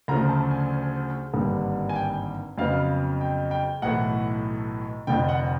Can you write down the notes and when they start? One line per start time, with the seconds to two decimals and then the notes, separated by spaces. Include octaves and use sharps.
0.08 D2 C#3 F3 A3 A#5
0.29 A5
0.51 G#5
1.33 G#1 G2 D3 G3 A#3
1.89 G#5
1.96 G5
2.58 F2 C#3 F#3 B3 F5
3.21 G5
3.51 G5
3.82 B1 A2 E3 A3 F#5
5.07 F1 F2 D3 F3 G5
5.29 F#5